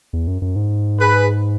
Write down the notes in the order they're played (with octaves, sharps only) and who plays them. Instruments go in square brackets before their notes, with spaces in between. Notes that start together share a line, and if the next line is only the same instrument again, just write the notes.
[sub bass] E2
F#2
F#2
G#2
[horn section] G#4 B4